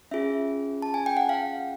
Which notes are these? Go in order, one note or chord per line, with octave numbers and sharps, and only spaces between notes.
C#4 F4 G#4 E5
A5
G#5
G5
F#5
F5